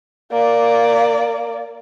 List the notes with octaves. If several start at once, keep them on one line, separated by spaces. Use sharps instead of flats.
A#3 D5